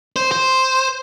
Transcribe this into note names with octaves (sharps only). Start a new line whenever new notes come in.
C5
C5